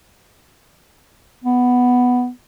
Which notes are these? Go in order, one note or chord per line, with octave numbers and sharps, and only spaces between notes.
B3